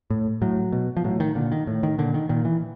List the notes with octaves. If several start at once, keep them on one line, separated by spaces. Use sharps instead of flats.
A2
A2 F#3
B2
F3
A2 F#3
D#3
A#2 D3
D#3
A2
D#3
A#2 D3
D#3
A#2 D#3
E3